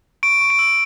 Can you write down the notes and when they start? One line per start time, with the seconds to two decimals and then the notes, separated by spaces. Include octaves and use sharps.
0.23 C#6 D7
0.41 C#6
0.50 D7
0.59 E6